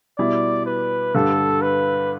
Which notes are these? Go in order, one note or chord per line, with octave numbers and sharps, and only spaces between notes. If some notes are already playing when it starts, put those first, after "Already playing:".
B2 G3 E4 D5
B4
G2 D3 G3 A4
B4